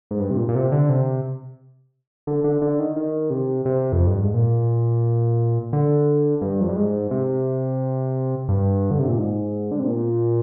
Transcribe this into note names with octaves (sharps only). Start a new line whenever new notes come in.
G#2
G2
C3
A#2
A#2
C3
D3
C3
D3
D3
D3
D#3
D#3
C3
C3
F2
G2
G#2
A#2
D3
G2
F2
G2
G#2
C3
G2
D3
C3
A#2
G#2
D3
C3
A#2